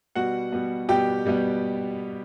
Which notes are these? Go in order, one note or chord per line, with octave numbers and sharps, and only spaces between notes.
B2 G3 B3 F#4 F#5
B2 G3 B3
B2 G3 B3 G4 G5
B2 G3 B3